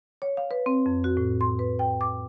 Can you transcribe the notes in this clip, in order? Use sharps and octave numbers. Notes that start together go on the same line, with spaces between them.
C#5
F5
B4
C4
F2
F#4
A2
C6
B4
G5
D6